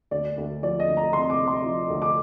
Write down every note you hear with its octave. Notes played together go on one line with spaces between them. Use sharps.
D2 D5
D2
F3 D5
D#5
D2
A#5
C3 C6
D6
C3
C6
F3
D2
D6